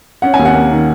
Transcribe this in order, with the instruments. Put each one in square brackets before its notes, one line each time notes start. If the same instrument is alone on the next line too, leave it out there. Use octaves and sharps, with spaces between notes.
[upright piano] C#4 F#5
G#5
D#2
F#5
A#3
D#3